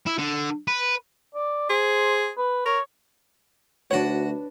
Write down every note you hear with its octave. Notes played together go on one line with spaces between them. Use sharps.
E4
D3
B4
D5
G#4 C5
B4
A#4 C#5
D2 D4 F#4 B4 C#5 F#5